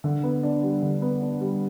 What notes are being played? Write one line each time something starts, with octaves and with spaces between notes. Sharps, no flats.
D3
B3
D4
G3
D3
B3
D4
G3